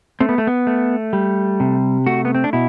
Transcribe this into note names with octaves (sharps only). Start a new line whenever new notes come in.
A3 C4
B3
A3
B3
A3
G3
C3
A3 F#4
B3
C4
D4
B2 E4